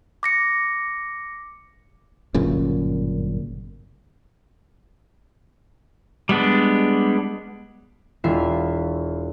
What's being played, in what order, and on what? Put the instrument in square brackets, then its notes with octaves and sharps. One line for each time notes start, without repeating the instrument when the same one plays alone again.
[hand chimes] D6 A#6 C#7
[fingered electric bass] G1 F#2 A#2 C#3
[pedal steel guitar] G3 G#3 B3 D4
[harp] E1 F4 E5 B5 C7